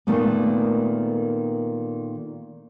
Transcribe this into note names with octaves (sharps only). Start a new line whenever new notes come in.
A#2 D#3 A3 B3